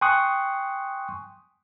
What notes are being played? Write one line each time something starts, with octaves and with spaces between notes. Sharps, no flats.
G5 G#5 C6 C#6 D#6 F#6